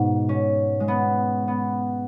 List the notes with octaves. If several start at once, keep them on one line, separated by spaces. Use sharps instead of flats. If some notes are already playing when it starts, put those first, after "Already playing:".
Already playing: G#2 B2
C#4
G#3
B3
B3